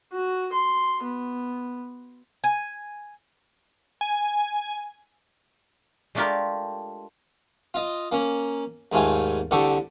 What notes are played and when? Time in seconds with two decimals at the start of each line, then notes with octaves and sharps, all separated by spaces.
0.13 F#4
0.53 C6
1.03 B3
2.44 G#5
4.01 G#5
6.15 G#3 A3 D4 F4 G4 A#4
7.74 F4 D#5
8.12 A#3 C#4
8.92 D#2 G#2 A3 F4 G#5
9.51 C2 D3 G4 A4 C#6